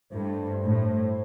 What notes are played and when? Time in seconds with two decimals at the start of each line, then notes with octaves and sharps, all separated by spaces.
0.13 G2 A3 E4 A4 C5
0.64 A2